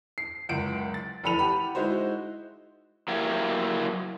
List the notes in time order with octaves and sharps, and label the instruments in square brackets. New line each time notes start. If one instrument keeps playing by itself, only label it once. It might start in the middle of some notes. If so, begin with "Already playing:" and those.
[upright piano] C7
F#1 C#2 F#5 D7
A6
F1 E3 A4 B5 D#7 F7
G4 F#5 B5
G#3 D#4 E4 F#4 C5
[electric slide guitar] F#3 A#3 E4 G4